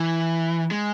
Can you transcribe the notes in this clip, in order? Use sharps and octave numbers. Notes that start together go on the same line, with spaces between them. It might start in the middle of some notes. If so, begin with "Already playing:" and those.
Already playing: E3
G#3